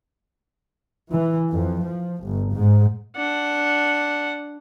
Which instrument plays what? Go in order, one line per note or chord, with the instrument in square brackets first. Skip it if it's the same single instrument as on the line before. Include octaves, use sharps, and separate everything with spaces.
[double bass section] E3
F2
F3
G1
G#2
[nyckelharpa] D4 F#5